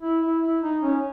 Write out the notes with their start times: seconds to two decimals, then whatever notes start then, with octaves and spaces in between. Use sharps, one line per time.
0.02 E4
0.22 E4
0.42 E4
0.62 D#4
0.82 C#4